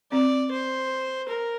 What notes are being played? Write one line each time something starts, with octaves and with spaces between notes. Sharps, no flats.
C4 D5
C5
A#4